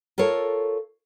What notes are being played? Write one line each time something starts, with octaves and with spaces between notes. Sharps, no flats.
F4 A4 A#4 C#5